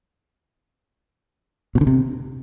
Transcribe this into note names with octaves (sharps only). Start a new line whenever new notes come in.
B2
D3
C3